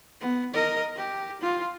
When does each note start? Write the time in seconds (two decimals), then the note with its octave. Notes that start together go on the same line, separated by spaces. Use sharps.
0.20 B3
0.53 A#4 D#5
0.96 G4
1.41 F4